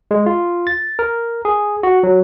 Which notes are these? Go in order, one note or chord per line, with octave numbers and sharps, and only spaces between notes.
G#3
F4
A6
A#4
G#4
F#4
F#3